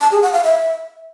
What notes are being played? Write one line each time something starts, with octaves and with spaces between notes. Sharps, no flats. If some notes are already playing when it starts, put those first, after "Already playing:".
A5
G#4
F#5
F5
E5